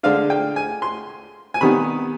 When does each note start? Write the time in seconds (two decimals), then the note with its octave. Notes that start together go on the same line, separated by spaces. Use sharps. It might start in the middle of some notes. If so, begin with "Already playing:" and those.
0.03 D3 G#3 D4 F5
0.30 G5
0.56 G#5
0.82 C6
1.54 G#5
1.61 C3 D#3 G3 B3 B5